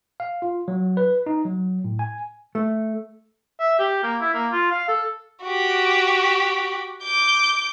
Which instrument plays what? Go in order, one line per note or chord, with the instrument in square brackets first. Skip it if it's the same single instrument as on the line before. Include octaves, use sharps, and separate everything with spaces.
[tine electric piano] F5
F4
F#3
B4
D#4
F#3
A2
G#5
[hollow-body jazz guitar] A3
[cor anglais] E5
G4
A#3
E4
A#3
F4
F5
A4
[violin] F#4 G4
D6 G6